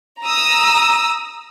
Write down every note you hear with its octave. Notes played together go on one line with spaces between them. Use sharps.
A#5 D#6 E6